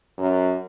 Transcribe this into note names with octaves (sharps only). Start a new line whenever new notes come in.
F#2